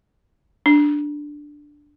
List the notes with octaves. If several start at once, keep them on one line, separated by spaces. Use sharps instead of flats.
D4